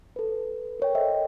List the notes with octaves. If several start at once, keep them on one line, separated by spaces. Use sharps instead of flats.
A4 B4
A#4 C#5 G5
A4 C5 D#5 E5 G5